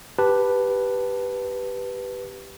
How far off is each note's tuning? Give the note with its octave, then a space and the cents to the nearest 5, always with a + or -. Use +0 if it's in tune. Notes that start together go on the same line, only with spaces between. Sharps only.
G4 +0 B4 +0 A5 +0